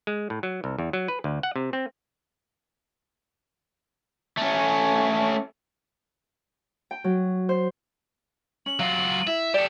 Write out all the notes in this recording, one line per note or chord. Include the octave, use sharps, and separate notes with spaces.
G#3
A2
F#3
C2
E2
F#3
B4
D2
F#5
C3
C4
A3 C#4
G5
F#3
C5
C#4 F#7
F#3 F4 F5
E4 E5
G4 A4 D5 E7